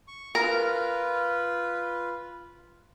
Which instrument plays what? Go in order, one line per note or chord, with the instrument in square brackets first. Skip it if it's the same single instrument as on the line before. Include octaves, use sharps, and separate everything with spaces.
[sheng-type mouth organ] C#6
[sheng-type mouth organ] F4 B4 [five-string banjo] A#4